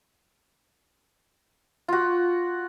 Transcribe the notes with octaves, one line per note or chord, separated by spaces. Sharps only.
F4 F#4